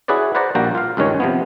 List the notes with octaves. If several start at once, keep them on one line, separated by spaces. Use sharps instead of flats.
E4 F#4 G#4 B4 C#5 D5
B4 C5 D5 F#5 A#5
A#1 G3 A#3 F#4 G5 A#5
F4 F5
C#2 G2 D#3 C#4 C#5
C3 F3 B3